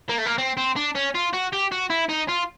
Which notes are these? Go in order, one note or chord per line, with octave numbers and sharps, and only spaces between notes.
A#3
A3
A#3
C4
C4
D4
C#4
F4
F#4
G4
F#4
E4
D#4
F4